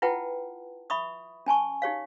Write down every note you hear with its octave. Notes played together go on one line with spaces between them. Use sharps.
E4 F4 B4 F#5 G5 A5
E5 B5 C#6 D#6
C#4 G#5 A5 C#6
D#4 G4 C#5 F5